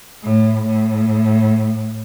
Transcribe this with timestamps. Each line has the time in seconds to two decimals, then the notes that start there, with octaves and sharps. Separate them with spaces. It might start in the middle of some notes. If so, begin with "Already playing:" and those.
0.23 A2
0.65 A2